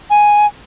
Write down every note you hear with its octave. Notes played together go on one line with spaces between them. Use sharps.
G#5